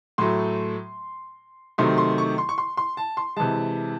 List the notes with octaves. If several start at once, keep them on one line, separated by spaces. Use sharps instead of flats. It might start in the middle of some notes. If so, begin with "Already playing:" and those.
A2 F#3 A3 C6
C3 D#3 F#3 A3 C6
C6
C#6
C6
C#6
C6
C6
A5
C6
C3 E3 G#3 A5